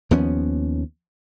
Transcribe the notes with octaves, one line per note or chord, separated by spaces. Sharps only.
D#2 F3 B3 C#4